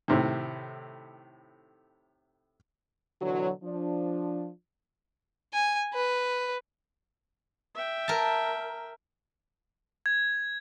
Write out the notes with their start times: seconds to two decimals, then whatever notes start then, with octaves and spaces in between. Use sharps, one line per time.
0.08 A2 C3 D#3
3.20 B2 D3 E3 F#3
3.63 F3 D4
5.54 G#5
5.94 B4
7.75 E5 G5
8.08 A#4 A5
10.06 G#6